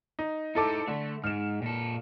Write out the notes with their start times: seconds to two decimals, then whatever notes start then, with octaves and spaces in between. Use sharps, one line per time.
0.19 D#4
0.55 D#4 E4 A4 C5 D6
0.88 D3 A3
1.24 G#2 F6 E7
1.62 A#2 A4